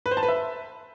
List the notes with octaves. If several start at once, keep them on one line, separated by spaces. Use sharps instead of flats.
B4
C5
A5
B4
E5